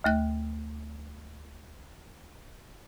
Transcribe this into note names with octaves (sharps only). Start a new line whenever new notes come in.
D2 A3 F#6